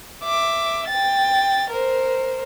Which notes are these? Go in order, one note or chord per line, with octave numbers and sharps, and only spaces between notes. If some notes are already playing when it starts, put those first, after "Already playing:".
E5 D6
G5 A6
A#4 C5